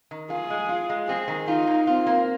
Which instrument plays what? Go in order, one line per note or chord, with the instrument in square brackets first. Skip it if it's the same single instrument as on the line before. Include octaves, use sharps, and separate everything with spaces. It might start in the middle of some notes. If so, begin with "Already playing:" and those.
[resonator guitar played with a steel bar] D#3
[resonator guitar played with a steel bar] F4 [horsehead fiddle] G#4
[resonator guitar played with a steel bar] G#3
F4
G#3
[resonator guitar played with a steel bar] C4 [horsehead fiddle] G#4
[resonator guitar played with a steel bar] D#3
[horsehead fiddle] D#4 [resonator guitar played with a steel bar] F4
[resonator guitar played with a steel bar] A#3
[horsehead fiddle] C4 [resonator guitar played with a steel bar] F4
[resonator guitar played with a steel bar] A#3